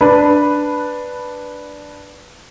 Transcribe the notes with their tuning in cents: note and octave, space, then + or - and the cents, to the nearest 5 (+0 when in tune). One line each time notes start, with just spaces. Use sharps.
D4 +0 B4 +0